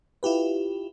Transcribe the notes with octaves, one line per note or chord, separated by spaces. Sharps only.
E4 F4 G4 B4